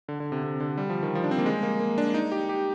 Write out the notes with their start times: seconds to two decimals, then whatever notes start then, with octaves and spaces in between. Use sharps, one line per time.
0.09 D3
0.20 D3
0.32 C3
0.43 C3
0.60 D3
0.78 G3
0.90 F3
1.03 D#3
1.15 F3
1.24 D4
1.31 C4
1.39 A#3
1.46 G#3
1.63 A#3
1.80 A#3
1.98 D4
2.14 D#4
2.32 G4
2.49 G4